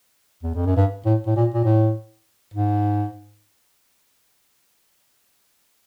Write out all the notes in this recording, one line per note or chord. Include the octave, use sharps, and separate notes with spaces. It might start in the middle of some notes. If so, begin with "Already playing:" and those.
E2
F2
F#2
G2
A2
A2
A#2
A#2
A2
G#2